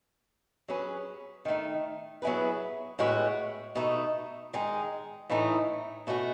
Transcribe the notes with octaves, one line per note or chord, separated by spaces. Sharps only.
F#3 C#4 G#4 B4
D#3 A3 D#4
F#3 B3 E4 G#4 B4
A2 G#3 B3 F#4 B4
B2 A3 D#4
D#3 G#3 D#4
A2 E3 A3 D#4
B2 A3 C#4 F#4